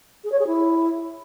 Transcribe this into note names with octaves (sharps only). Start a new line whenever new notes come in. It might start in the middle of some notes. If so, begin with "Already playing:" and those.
G#4
C#5
G#4
E4